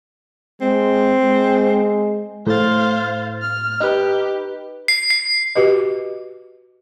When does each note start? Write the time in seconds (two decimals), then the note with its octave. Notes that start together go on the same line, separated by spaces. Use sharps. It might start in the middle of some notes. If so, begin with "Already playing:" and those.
0.62 G#3 C4
1.22 G#3
2.47 A2 C5 F5 A6
3.42 F6
3.80 D#4 G4 B4
4.88 C7
5.10 C7
5.55 F#4 G4 B4 D#5